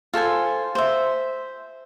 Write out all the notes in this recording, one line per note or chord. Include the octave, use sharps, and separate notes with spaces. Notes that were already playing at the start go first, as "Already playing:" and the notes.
F4 A4 C5 G#5
C5 E5